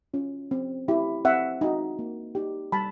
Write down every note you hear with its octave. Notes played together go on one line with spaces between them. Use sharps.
C#4 F4
C4
E4 G4
C4 E5 F#5
D#4 F#4
A#3
D#4 G4
G3 A5 B5